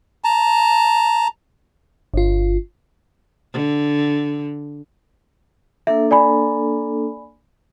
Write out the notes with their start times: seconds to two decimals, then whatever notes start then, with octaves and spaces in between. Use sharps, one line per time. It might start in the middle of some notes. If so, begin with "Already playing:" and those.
0.24 A5 A#5
2.14 G1 F4
3.53 D3
5.87 A#3 D4 A4 E5
6.11 D5 G#5 B5